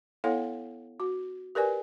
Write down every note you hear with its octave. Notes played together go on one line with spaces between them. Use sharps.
B3 E4 A4 C#5 F5 F#5
F#4
G4 A#4 B4 D5 G#5